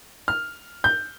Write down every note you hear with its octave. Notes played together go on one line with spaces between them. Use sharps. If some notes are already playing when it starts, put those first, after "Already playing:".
F6
G6